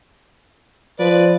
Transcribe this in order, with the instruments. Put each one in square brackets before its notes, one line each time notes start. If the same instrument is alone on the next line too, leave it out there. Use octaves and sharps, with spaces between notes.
[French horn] F3 [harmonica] B4 D5